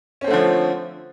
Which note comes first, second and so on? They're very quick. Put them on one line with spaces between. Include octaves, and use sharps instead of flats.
C#4 C4 A3 D3 F3